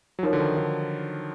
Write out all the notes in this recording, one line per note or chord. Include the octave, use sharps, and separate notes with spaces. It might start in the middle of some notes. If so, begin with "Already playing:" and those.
F#3
F3 D#4 F#4 A#4 C#5
D3
D#3
D3